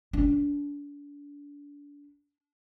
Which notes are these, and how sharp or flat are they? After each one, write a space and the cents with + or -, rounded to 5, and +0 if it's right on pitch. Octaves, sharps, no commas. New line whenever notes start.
D4 -30